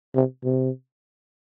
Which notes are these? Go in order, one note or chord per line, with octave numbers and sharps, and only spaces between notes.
C3
C3